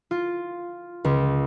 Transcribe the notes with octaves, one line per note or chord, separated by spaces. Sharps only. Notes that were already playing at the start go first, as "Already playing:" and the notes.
F4
C#2